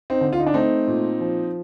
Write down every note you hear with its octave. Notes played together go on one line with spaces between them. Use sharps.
C4 D#4
D3
F4
D#4
D4
A3 C4 D#4
A#2
F3